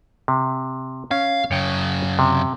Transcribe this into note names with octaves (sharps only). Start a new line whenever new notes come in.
C3
C#4 F5
F#2 C#3 C#5 G5
C3